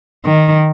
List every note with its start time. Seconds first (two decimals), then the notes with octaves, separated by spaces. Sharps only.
0.25 D#3